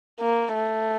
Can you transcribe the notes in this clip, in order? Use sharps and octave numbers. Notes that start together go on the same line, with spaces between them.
A#3
A3